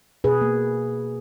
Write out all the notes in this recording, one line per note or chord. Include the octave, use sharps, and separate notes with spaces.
B2 G#4 B4
A#3